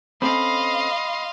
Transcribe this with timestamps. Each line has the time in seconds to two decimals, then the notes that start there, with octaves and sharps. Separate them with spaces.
0.22 C4 C#4 A4 D#5 F5 B5 C6